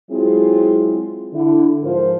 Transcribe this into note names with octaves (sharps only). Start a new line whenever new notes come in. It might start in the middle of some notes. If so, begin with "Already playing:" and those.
F#3 G#3 C4 E4 F4 G#4
D3 E4
G#2 F3 F4 A#4 C5